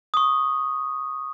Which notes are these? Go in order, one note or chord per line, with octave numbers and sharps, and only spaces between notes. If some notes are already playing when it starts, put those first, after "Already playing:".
C#6 D#6